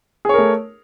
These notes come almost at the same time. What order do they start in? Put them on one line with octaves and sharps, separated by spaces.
G#4 C#5 A#4 A3